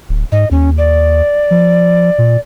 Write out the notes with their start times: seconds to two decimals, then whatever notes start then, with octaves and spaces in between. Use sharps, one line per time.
0.09 D1
0.32 G#2 D#5
0.51 D#2 C#4
0.78 D5
1.51 F3
2.18 A#2